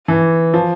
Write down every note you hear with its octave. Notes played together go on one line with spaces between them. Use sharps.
E3
F3